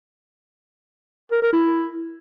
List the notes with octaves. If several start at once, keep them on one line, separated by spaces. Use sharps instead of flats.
A#4
A#4
E4